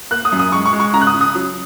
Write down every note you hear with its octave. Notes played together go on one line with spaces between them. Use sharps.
A#3 F#6
D#6
F#2
D#6
G#3 C#6
C#6
G#3
C#6
C#3 A#5
F#6
D#6
C#3
D#6
F#3